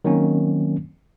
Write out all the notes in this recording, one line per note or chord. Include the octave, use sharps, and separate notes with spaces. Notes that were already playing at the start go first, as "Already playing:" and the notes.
D#3 F#3 A#3 C4 C#4